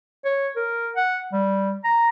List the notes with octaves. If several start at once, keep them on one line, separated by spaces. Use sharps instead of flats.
C#5
A#4
F#5
G3
A#5